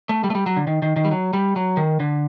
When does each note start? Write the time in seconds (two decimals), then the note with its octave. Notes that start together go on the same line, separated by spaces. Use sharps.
0.09 A3
0.24 G3
0.30 A3
0.35 G3
0.46 F#3
0.56 D3
0.67 D#3
0.82 D#3
0.96 D#3
1.05 G3
1.11 F#3
1.33 G3
1.56 F#3
1.77 D#3
2.00 D3